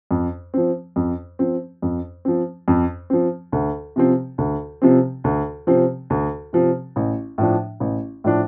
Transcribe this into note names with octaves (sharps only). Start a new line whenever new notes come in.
F2
F3 C4
F2
F3 C4
F2
F3 C4
F2
F3 C4
D2
C3 F3 C4
D2
C3 F3 C4
D2
C3 F3 C4
D2
C3 F3 C4
A1
A2 F3 D4
A1
A2 F3 D4